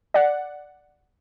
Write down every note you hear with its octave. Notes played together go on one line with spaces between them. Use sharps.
D5 F#5